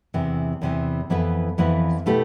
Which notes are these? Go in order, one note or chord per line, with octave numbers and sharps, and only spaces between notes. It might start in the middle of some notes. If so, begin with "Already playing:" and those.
E2 C3 E3
E2 C3 E3
F2 E3 B3 E4 B4
F2 E3 B3 E4 B4
B2 A3 E4 G4 B4